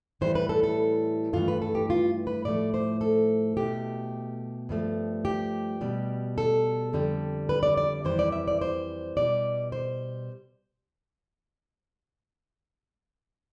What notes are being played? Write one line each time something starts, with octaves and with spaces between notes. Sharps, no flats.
A2 E3 G3 C5
B4
A4
A4
G2 E3 A3 F4
B4
A4
G4
F4
B4
A2 F3 A3 D5
C5
A4
B2 A3 G4
G2 F3 A3
G4
B2 G3
A4
F2 D3 G3
B4
D5
D5
F2 E3 G3 C5
D5
E5
D5
C5
B2 G3 D5
C5